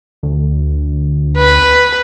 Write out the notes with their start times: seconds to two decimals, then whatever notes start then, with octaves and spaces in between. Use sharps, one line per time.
0.23 D2
1.37 B4